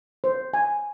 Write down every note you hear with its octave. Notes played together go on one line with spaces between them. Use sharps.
C5
G#5